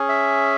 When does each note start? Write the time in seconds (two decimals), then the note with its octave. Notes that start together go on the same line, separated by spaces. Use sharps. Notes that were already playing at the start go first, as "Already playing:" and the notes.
Already playing: C#4 G#4
0.09 E5